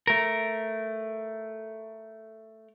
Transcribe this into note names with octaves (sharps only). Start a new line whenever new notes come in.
A3 A#4